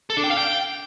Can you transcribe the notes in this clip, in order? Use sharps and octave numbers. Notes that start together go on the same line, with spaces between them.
A4
D4
G5
F5
G5